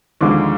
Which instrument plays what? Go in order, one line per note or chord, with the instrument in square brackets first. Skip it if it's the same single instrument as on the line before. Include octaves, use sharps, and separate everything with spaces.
[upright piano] D#2 D3 F3 G#3 D6